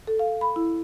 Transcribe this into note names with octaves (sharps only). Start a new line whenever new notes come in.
A4
F5
B5
E4